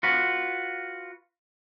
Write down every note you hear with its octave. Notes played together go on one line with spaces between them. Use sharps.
F4 F#4 B4